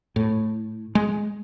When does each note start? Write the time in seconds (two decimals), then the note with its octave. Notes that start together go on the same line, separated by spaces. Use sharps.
0.16 A2
0.95 G#3